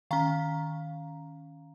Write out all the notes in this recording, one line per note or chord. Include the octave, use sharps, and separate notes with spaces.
D#3 C#4 F5 A#5